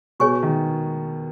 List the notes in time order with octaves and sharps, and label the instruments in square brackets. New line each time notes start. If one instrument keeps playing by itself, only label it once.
[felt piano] B2 [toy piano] G#4 C#5 G#5 C#6
[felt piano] D#3